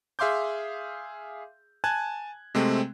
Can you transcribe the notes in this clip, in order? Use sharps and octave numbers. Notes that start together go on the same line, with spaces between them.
G#4 E5 F5 C6 D6 G6
G#5 A5 F#6 G#6
C3 G#3 A3 C4